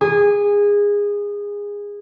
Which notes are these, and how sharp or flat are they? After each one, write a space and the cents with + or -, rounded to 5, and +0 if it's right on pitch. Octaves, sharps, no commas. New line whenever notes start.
G#4 -20